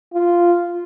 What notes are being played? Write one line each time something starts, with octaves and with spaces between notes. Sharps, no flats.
F4